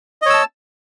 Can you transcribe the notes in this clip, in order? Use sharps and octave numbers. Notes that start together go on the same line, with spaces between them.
C#5 D#5 A5 E6